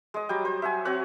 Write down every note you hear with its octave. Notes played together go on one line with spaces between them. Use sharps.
G#3 D#5
F#3 G3 G5
C5
E5 F#5 G#5
C4 F#4 C#5 F#5